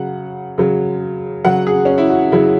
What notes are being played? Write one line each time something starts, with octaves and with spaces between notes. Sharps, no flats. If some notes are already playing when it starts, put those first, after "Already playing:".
Already playing: C#3 F#3 F#5
C#3 F#3
C#3 F#3 F#5
G#4
C#4
E4
F#4
C#3 F#3 E4